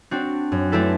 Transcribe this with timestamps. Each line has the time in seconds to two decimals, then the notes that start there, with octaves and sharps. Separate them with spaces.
0.11 C4 D4 F#4
0.52 F#2
0.72 A3 C4 D4 E4 A4 B4